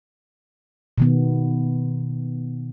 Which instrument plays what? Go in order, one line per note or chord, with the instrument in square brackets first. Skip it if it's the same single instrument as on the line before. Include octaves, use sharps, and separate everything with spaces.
[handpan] B2 D#3 B3